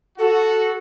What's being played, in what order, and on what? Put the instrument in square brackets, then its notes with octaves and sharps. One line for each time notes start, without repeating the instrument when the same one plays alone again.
[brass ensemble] F#4 [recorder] A4